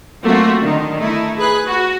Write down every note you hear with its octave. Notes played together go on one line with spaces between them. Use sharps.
F#3 A3 A#3 C4 F4 F#4
D3 D#3
A3 D#4 E4
G#4 B4 F#6
F#4